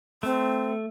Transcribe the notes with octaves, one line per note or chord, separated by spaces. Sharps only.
A3 C4